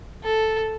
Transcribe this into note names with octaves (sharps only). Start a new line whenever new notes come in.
A4